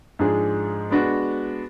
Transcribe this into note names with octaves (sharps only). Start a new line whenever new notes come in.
G#2 F3 G#3 D4 G#4
G#3 B3 D4 F#4